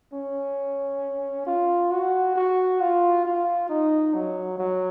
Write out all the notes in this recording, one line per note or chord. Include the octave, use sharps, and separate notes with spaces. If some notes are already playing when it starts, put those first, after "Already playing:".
C#4
F4
F#4
F#4
F4
F4
D#4
F#3
F#3